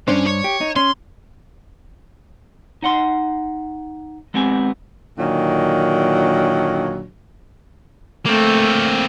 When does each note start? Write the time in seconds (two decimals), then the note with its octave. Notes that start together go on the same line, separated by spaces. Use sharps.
0.08 G2 C#4 D4 C5
0.26 C#5
0.44 G4
0.61 D#4
0.76 C#4 C6
2.82 D#4 F#5 C6
4.34 G#3 B3 C4 G4 G#5
5.19 A#2 D3 D#3 F#3 D4
8.26 A3 A#3 C4